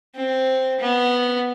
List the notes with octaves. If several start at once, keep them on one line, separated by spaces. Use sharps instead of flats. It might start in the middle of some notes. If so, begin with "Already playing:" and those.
C4
B3